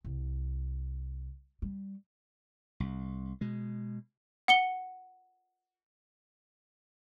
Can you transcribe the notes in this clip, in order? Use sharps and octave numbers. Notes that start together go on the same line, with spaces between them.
C2
G3
C2
B2 G#3
F#5 C#7 G7